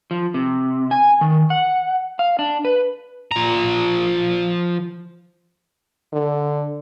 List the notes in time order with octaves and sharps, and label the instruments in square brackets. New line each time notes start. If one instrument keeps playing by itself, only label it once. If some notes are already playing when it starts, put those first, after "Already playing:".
[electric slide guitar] F3
C3
G#5
D#3
F#5
F5
D4
B4
[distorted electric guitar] F3 A#5
[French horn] D3